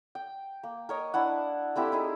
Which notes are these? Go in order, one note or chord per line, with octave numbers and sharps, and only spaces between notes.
G5
A#3
A#4 C#5 D#5
D4 E4 F#5
A3 C4 E4 G4
D#4 E4 G#4